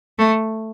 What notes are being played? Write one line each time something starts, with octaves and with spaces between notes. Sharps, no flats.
A3